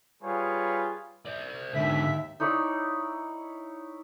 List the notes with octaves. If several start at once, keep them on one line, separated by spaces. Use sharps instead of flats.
G3 F4 G#4 B4 C#5
C5 D5
D#2 G#2 D3 E5
D#4 E4 C#5 D5